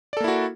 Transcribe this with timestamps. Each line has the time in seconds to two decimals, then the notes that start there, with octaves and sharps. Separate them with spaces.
0.13 D5
0.17 A4
0.20 A#3
0.24 E4
0.28 F#4